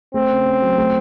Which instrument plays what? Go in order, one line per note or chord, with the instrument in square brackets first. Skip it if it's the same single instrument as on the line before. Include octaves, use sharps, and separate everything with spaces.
[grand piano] A3 [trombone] C4
[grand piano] C#3
C#4
F#3
A3